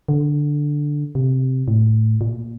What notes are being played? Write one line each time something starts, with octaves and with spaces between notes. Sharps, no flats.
D3
C3
A2
A#2